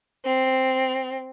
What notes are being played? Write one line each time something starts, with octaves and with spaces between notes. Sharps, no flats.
C4